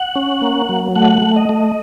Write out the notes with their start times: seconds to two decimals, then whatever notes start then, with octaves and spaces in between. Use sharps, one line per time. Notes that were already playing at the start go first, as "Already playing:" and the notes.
Already playing: F#5
0.16 C#4
0.42 A#3
0.69 F#3
0.96 A3 F#5
1.22 A3
1.36 D#5
1.49 A3